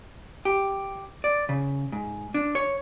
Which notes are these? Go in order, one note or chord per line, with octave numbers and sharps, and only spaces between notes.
G4
D5
C#3
G#2
D4
C#5